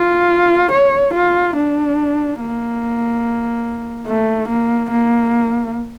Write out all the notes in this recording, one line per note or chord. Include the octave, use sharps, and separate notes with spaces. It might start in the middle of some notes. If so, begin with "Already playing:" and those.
Already playing: F4
C#5
F4
D4
A#3
A3
A#3
A#3